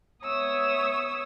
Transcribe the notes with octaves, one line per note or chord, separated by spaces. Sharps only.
B3 C#5 E5 D#6 E6